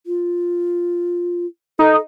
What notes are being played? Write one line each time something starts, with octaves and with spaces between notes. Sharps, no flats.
F4
D#4 A4